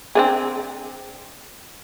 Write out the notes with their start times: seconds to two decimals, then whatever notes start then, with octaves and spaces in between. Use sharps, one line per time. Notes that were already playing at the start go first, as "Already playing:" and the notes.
0.15 C4 D4 G#4